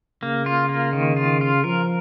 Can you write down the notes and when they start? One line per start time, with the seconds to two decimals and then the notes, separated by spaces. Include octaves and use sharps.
0.23 C#3 A#3
0.46 F4
0.69 A#3
0.93 D#3
1.16 F4
1.41 F4
1.64 F3 A#4